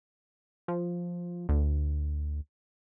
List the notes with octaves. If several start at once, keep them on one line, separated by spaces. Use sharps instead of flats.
F3
D2